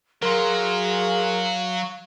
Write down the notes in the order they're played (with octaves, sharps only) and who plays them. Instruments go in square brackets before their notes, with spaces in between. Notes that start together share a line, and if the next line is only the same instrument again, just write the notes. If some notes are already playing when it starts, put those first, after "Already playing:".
[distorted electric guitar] F#3 [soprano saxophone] G#4 [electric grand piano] A#4 C6 [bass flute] F5